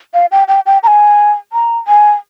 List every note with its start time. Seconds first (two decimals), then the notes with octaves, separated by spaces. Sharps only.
0.14 F5
0.32 G5
0.48 G5
0.66 G5
0.83 A#5
0.87 G#5
1.53 A#5
1.88 G#5